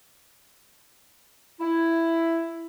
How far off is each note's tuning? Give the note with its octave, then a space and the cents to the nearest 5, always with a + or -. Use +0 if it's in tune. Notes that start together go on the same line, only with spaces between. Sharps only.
E4 +5